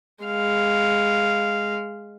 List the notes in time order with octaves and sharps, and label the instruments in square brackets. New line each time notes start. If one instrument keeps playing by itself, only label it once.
[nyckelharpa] G#3 F5